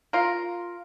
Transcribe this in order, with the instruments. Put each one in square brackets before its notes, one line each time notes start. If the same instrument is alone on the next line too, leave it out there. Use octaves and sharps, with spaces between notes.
[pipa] F4 A#4